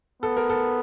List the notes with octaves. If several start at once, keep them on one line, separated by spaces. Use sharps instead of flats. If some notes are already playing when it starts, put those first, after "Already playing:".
B3 A4
A#4
A4